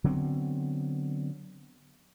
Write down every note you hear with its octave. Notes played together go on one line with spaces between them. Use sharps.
D3 F#3 B3 C4